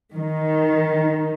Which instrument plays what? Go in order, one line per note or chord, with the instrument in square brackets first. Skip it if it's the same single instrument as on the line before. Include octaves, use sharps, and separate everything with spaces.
[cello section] D#3